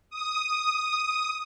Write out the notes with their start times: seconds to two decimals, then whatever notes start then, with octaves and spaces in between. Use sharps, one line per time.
0.10 D#6